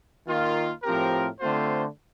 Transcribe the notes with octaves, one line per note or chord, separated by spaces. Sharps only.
D#3 A#3 F4
A2 F3 C4 G4 A#4
D3 A3 C4 F4 C5